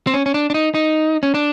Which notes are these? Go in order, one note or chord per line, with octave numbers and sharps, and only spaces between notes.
C4
C#4
C#4
D4
D4
D#4
D#4
C#4
D4